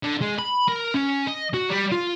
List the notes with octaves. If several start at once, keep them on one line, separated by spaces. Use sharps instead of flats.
D3
G#3
B5
A#4
C#4
D#5
F#4
G3
F4